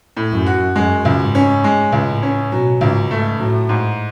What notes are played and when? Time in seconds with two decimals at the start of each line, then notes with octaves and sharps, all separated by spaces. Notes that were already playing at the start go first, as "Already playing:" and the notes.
0.17 A2
0.32 F#2
0.46 F#4
0.75 F#2 G#3
1.05 C#2
1.20 G#2
1.35 C#4
1.64 G#2 G#3
1.92 C#2
2.08 A2
2.23 C#4
2.52 B2 F#3
2.80 C#2 G#2
3.10 G#2 A3
3.39 A2 F#3
3.69 G#2